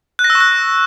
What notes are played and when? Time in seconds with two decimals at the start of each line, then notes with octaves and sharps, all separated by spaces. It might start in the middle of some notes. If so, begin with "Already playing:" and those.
0.19 F#6
0.24 A#6
0.30 E6
0.35 C#6
0.40 F#6